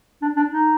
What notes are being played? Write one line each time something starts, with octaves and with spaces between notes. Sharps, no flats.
D4
D4
D#4